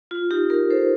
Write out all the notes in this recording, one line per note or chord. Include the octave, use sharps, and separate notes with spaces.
F4
D#4 G4
G4 A#4
A4 C5